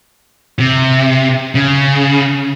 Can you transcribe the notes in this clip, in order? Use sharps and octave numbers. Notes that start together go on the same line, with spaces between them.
C3
C#3